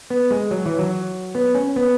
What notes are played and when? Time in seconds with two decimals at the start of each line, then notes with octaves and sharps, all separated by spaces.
0.10 B3
0.31 G#3
0.51 F#3
0.66 E3
0.79 F#3
1.35 B3
1.55 C#4
1.76 B3